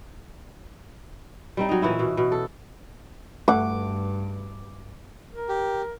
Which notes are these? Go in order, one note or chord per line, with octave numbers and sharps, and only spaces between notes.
G3 C4 D#4
F#3 D#4
A#2 E3 C#4 E4
B2
B2
A4
G2 A3 F#5 D6
A#4
G4